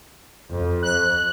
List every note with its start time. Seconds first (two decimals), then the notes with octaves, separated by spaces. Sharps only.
0.51 F2
0.83 F#6